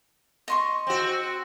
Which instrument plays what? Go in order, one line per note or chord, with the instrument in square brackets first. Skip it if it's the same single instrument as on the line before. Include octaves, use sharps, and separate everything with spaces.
[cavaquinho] D#5 C6 C#6
[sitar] C4 F#4